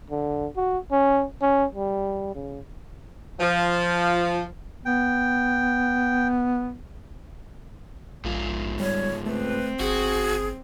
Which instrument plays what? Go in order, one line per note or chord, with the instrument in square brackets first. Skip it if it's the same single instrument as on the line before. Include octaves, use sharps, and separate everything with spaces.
[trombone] D3
F#4
C#4
C#4
G3
C#3
[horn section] F3
[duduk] B3 [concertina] G5
[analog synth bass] A#1 [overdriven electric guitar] G#2 F4
[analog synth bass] G3 [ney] C#5
[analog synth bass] A3 [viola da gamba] C4 [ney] B4
[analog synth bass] G1 [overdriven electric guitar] F#4 [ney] G#4